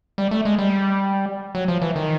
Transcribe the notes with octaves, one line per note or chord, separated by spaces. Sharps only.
G3
A3
G#3
G3
F#3
F3
E3
D#3